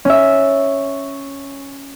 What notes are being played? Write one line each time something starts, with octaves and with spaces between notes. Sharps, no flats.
C#4 E5